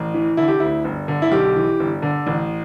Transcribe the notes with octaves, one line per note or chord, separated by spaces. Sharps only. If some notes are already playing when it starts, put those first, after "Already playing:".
Already playing: A1
E3
D3 E4
G4
D2 E4
G1
D3
E4
B1 G4
E3
G1
D3
A1